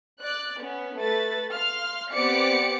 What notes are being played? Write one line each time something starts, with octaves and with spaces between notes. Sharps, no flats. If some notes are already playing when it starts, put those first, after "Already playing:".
D5 F#6
B3 C#4
A3 A4 B4 A6
F5 C6 F6
B3 C4 G4 D5 D6 C#7